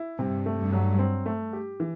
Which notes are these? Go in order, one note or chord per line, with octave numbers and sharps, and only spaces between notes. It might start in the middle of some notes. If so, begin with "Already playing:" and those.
Already playing: E4
G2 C3
A3
G2
F#3
C4
A3
G4
E3